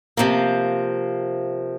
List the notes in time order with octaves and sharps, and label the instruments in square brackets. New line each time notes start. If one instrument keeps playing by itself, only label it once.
[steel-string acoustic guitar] C3 F3 A#3